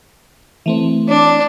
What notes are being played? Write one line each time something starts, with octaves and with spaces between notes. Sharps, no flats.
E3 A3 C4
D4